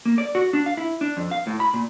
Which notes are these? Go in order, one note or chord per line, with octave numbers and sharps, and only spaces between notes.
A#3
D5
F#4
D4
F5
E4
D4
F2
F5
A2
B5
A#2